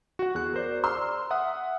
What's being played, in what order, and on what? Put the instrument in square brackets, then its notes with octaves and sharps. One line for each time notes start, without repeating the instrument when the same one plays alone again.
[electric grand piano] F#4 F#5
E2 G#4 F#6
A#4 C5 D5
[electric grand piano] D5 F6 [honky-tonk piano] C6 E6
[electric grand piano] E5 F#5 D#6